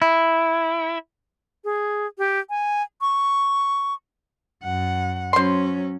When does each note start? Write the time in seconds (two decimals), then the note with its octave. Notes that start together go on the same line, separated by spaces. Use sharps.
0.02 E4
1.64 G#4
2.18 G4
2.50 G#5
3.01 C#6
4.64 F#2 F#5
5.33 F#3 C#4 C5 C6